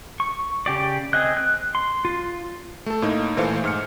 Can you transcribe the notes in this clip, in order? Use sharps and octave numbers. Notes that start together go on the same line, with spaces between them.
C#6
C#3 G4 D5
C4 G#4 D#5 F#6
F#6
C6
F4
A3 A4
A2 A#3 D#4
A#2 E3 A3 C5 F5 C#7
G#2 F6 C#7